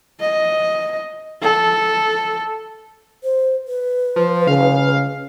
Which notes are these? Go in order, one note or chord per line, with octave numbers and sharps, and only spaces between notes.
D#5
A4
C5
B4
F3
C#3 F5